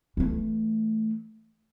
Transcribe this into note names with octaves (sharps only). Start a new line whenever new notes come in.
E3 A3